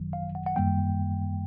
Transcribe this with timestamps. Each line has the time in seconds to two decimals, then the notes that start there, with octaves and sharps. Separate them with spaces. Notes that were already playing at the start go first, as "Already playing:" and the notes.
Already playing: G#1 F#2 D#3 F#3
0.13 F5
0.35 F#5
0.46 F#5
0.56 F#2 D#3 G3 A#3 G5